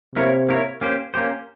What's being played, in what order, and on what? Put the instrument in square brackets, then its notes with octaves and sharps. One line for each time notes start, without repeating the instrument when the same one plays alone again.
[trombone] C3 [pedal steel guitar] A#3 E4 A#4 C#5
[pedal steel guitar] A#3 E4 A#4 C#5
A#3 C#4 G4 C5
A#3 C#4 G4 C5